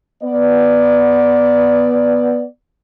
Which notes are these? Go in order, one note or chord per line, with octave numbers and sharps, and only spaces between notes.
B3 D5